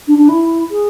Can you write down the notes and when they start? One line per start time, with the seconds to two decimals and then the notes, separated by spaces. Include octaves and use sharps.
0.08 D4
0.18 D4
0.29 E4
0.71 G#4